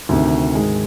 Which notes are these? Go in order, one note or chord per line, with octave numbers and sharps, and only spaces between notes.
D2 C3 D#3
G#2 D#3 G#3